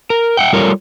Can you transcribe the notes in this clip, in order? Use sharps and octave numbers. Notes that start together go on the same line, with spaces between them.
A#4
E5 F#5 G5
G3 F4 A4 A#4 C#5 D5